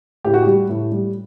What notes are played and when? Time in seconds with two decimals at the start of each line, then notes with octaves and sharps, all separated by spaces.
0.25 A2 G4
0.34 F#4
0.43 G3 G4
0.69 A2
0.92 G3